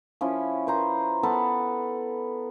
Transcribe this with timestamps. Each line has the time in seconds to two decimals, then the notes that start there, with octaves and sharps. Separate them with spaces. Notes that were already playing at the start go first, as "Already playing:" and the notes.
0.21 F3 C#4 E4
0.67 B4 C5 A#5
1.23 B3 A4 B4 A5